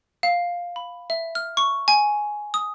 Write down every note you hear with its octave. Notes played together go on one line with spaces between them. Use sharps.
F5
B5
E5
F6
C#6
G#5
D#6